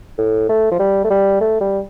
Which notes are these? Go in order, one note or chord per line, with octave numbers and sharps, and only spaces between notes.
A2
A3
F3
G3
A3
G3
A3
G3